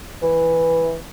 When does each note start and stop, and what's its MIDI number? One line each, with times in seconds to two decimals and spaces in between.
0.22 0.97 52